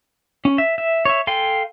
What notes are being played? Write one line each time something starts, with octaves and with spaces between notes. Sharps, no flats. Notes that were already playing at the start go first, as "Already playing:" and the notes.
C#4
E5
E5
C#5 E5
A4 F5 G5 G#5 C6